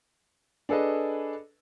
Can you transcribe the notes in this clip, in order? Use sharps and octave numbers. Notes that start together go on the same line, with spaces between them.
D4 G#4 A4 B4 D#5